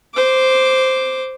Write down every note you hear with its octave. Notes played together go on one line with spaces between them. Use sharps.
C5 D6